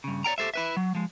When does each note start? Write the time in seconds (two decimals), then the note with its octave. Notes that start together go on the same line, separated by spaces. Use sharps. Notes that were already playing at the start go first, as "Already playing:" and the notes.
0.04 G2 C#3
0.24 C#5 D5 G5 A#5
0.38 G4 A4 C5 E5
0.54 E4 B4 E5
0.77 F#3
0.95 F3 G#3